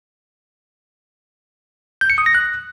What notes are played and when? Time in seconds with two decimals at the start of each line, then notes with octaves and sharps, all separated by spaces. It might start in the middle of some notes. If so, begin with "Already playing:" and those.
2.01 G6
2.10 C#7
2.18 D#6
2.26 A#6
2.35 F#6